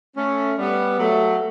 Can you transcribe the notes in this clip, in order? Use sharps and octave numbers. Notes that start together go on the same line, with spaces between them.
A3 C#4
G3 B3
F#3 A3